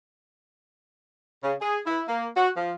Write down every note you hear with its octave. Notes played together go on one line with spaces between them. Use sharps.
C#3
G#4
E4
A#3
F#4
F3